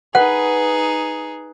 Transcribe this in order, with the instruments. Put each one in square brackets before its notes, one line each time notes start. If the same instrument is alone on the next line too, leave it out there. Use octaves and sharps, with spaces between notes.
[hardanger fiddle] D#4 G#4 [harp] B4 [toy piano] F#5